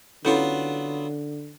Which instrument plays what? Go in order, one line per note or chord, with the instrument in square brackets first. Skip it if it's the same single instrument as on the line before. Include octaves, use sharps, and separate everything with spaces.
[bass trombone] D3 [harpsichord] F#3 B3 F4 [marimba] C#4 E4 A4